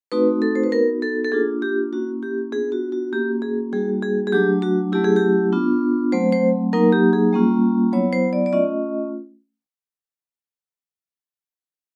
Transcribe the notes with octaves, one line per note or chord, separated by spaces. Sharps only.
A3 C4 D#4 F#4 B4
A4
C5
B4
B3 D#4 F#4 A#4
A4
A4
A#3 D4 F4 G#4
G4
A#3 C#4 E4 F#4
G4
B3 D4 F4 G#4
F#4
F#4
A#3 C#4 F#4 G4
G#4
G3 A#3 D#4 F#4 G#4
G#4
G#4
F#3 A3 D4 G4
F#4
F#3 A3 C#4 E4 G4
G#4
G4
B3 D4 F4
F#3 A3 C4 C5
C5
F#3 A#3 D#4 A#4
G4
G#4
G3 A#3 C#4 F4
F#3 B3 E4 C#5
C5
D5
D5
A3 C#4 F4 D#5